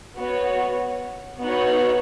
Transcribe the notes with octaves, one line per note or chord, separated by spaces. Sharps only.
B3 F#4 C#5
B3 D#4 F#4 C#5 F#5